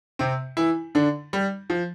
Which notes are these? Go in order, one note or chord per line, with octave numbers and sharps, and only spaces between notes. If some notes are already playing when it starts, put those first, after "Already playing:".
C3 C4
E3 E4
D3 D4
G3
F3